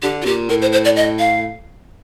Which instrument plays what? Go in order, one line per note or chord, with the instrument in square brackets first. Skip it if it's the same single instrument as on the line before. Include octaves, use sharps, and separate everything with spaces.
[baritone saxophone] D3 [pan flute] G4
[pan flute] F4
[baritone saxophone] A#2 [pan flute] G4
[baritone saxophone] A2 [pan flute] A#4
[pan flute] C5
C5
D5
D#5
F5